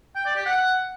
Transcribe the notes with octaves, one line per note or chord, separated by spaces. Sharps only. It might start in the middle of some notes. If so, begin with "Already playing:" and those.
G5
D5
G4
F#5